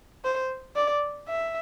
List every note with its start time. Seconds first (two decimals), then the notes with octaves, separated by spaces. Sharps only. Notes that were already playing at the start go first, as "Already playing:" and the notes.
0.24 C5
0.76 D5
1.28 E5